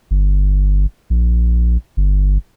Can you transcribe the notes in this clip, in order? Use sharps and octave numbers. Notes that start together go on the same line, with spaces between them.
G1
A#1
G1